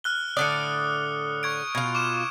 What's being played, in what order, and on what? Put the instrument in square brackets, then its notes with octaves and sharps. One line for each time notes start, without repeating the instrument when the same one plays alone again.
[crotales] F6 F#6 G7
[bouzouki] A2 D3 D5 [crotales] D#6 F#6 C#7
[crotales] C#6 G#6 D7
[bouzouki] B2 F4 [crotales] G#6
[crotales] D6 E7